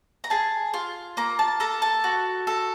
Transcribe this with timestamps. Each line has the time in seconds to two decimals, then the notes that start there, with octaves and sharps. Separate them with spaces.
0.24 A#5
0.30 G#4 A5
0.74 F4
1.17 A#3 A#5
1.39 A5
1.60 A4 A#5
1.82 A5
2.04 F#4
2.47 A4